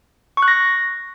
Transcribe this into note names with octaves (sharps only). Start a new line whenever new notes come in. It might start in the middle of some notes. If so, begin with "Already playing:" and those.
C#6
F#6
A#6